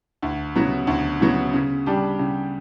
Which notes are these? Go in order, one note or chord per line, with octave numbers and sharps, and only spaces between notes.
D2
C#3 F#3 B3
D2
C#3 F#3 B3
C#3
G3 D4 G4
C#3